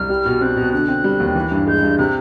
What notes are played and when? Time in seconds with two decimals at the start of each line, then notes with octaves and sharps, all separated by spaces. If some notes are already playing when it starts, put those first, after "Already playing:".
Already playing: C2 F6
0.09 G3
0.25 B2
0.41 C4 F#6
0.57 B2
0.73 D3 F#6
0.88 C4
1.04 G3
1.20 D#2
1.35 E3
1.52 G2
1.67 G#3 G6
1.83 G2
1.98 C3 F#6